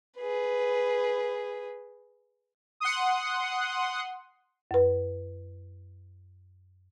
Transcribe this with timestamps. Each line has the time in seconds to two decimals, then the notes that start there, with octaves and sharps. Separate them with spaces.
0.18 G#4 B4
2.80 F#5 C6 D#6
4.71 F#2 B4